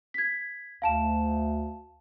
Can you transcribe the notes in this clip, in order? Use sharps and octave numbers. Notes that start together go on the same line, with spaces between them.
G#6 B6
D2 F5 A5 E7